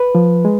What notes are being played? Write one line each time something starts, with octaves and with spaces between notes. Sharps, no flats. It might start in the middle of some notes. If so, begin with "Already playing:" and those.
Already playing: B4
F3
G#3